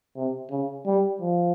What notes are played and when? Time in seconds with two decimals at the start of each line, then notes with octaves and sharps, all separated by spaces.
0.16 C3
0.51 C#3
0.86 G3
1.21 F3